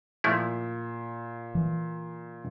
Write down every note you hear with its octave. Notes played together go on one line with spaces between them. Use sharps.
A#2 F3 A3 E4
E3